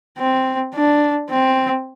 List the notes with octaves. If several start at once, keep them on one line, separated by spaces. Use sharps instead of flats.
C4
D4
C4